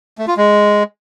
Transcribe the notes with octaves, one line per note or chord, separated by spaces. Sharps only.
A3
F4
G#3